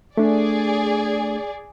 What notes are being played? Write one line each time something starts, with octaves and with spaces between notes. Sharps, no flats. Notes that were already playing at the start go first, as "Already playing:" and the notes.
A3 D4 G#4 D5